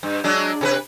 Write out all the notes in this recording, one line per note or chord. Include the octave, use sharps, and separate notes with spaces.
G2
F#3 G#3 D4
C3 A4 B4